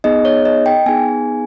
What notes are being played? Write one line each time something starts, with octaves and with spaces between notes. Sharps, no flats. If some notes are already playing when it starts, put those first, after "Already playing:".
B3 D#4 G#4 D#5
C#5
D#5
G5
B3 D#4 G#4 G#5